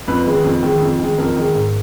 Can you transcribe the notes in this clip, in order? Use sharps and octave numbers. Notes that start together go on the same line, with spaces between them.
F2 B4
D#3 G#3
F2
D#3 G#3
F2
D#3 G#3
F2 A#4
D#3 G#3
G#2